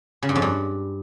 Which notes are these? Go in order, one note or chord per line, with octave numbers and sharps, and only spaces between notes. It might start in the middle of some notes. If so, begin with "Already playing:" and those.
C#3
G2
F2
G2